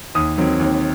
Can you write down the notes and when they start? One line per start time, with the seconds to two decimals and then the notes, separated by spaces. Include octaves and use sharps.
0.15 D#2 D#6
0.37 D#3 F#3 C4
0.59 D#2